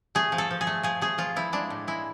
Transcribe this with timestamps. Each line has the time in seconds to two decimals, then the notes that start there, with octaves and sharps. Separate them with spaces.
0.15 A3 G#4
0.32 F3
0.38 A4
0.51 F3
0.61 G#4
0.67 A3
0.83 F3 G#4
1.01 A3 G#4
1.18 F3 F4
1.36 F3 E4
1.53 G#3 D4
1.70 A2
1.87 G#3 E4